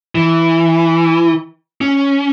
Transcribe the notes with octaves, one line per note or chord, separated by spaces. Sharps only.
E3
C#4